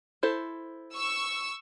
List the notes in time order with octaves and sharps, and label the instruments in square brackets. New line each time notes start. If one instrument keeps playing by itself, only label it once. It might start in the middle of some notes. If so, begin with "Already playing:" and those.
[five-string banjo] E4 A4 C5
[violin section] C#6 E6